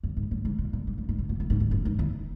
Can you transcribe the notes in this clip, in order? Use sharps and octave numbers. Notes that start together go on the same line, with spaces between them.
F#2
G#2
F#2
G#2
A#2
A#2
G#2
F#2
G#2
C#3
B2
A#2
G#2
E2
F#2
G#2
E2